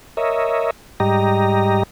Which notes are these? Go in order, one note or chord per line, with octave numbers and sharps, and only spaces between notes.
A#4 C#5 D#5 E5
G#2 G3 G4 D#5 A#5